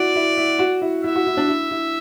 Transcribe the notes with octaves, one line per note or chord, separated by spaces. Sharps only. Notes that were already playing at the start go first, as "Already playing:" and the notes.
Already playing: E4 F#4 D5
E4
E4
F#4
E4
E4 E5
F#4
E4
D4
E4
E4